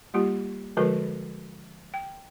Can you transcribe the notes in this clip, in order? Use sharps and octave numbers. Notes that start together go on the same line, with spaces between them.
G3 A#3 F4 G4
D3 F3 G#3 F#4 A#4 B4
G5